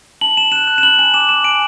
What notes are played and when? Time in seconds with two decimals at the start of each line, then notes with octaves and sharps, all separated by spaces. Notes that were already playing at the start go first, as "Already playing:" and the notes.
0.21 A5 F#7
0.37 A5 E7
0.52 F#6 E7
0.68 F#6
0.78 E7
0.83 B5 F#7
0.99 G#5 E7
1.14 D6 E7
1.29 D6 E7
1.44 G#5 D7